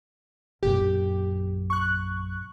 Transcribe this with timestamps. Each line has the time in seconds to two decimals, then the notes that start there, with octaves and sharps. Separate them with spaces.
0.63 A#1 F#2 G4
1.70 C#6 F#6